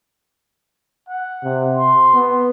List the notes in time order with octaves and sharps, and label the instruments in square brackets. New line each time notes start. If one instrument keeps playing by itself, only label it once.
[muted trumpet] F#5
[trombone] C3
[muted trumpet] C6
[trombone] B3